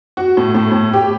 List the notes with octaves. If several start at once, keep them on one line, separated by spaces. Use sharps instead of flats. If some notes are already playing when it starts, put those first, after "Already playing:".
F#4
A2
A2
A2
G4